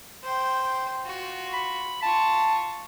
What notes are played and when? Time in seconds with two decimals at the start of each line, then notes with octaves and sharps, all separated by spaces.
0.23 C5 G5
1.04 F4 F#4
1.53 B5
2.03 F4 A5 C#6